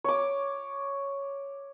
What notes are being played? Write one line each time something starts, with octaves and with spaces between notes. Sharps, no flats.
C#5 D6